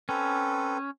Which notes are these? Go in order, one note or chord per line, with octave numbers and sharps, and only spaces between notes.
C4 C#4 A4 B4